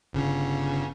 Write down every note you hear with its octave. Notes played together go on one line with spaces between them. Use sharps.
G1 C#3